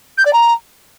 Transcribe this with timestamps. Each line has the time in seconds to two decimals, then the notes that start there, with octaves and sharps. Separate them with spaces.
0.17 G6
0.25 D5
0.33 A#5